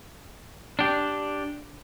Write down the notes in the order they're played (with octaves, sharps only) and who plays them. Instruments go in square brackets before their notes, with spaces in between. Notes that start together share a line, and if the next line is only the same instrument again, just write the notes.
[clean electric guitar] D4 G4